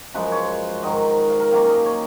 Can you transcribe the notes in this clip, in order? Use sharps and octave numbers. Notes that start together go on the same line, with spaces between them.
F#2 F3 G#3 B4
C#5
G#2 D#3 F#3 D#5
F5
A#4
D#3 F#3 A#3 C#4 F5
D#5
C#5